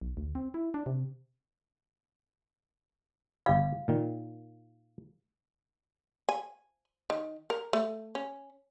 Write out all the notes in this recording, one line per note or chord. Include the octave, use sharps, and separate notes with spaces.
B1
D2
C4
E4
D4
C3
G1 G4 D#5 F5
A#2 D#3
G#5
D#3
A#4
A3
C#4